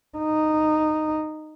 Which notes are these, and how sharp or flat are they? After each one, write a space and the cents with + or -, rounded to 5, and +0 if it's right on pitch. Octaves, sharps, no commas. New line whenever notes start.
D#4 -10